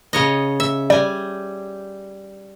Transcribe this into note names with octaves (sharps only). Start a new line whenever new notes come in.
C#3 C#5 D#5
E5
G3 D5 G#5